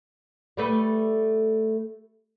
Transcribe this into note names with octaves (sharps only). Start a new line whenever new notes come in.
G3 A3 B4